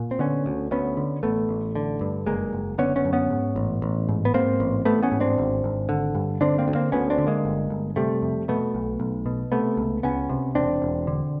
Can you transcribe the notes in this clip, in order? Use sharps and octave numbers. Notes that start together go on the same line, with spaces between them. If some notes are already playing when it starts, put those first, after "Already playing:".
Already playing: A#2
C4
D3 B3 C#4
D2
D2 B3 C#4
D3
A1 A3 B3
A1
D3
G2
F#1 G#3 A#3
F#1
D3 B3 C#4
B3 C#4
F#2
B3 C#4
G#2
A1
A1
G#2
B3
G#2 A#3 C4
A1
A1 A3 B3
B3 C#4
G#2
C4 D4
G#1
G#1
D3
G2
D3 C4 D4
A#3 C4
D2
A#3 C4
D2 B3 C#4
C4 D4
D3
G#3 A#3
G1
G1
C3 G3 A3
F2
B2 A3 B3
B1
B1
B2
C3 A3 B3
C#2
C#2 B3 C#4
C3
E1 C4 D4
E1
D3